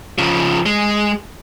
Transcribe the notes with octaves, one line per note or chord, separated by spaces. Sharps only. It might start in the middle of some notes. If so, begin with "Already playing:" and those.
C#3 F3
G#3